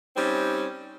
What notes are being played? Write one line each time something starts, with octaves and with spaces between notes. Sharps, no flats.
G3 C4 C#4 D#4